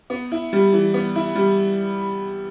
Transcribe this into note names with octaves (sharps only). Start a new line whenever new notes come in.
B3
E4
G3
E3
B3
E4
G3